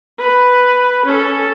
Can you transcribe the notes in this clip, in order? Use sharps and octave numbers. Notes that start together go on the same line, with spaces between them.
B4
C#4 A4